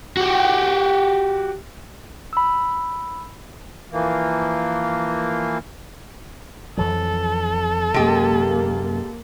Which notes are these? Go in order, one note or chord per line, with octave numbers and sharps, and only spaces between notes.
F#4 G4
B5 E6
E3 F3 A#3
F2 E3 F#3 A4
F#2 C3 G#3 A#3 G4